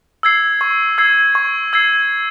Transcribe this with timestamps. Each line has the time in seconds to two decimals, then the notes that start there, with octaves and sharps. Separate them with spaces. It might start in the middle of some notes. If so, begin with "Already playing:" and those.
0.23 E6 G#6 C7
0.61 C#6
0.98 E6 G#6 C7
1.35 C#6
1.73 E6 G#6 C7